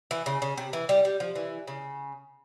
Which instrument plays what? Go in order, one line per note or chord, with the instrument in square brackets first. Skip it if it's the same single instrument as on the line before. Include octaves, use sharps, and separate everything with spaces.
[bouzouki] E3
C#3
C#3
C3
E3
G3
G3
F3
E3
C#3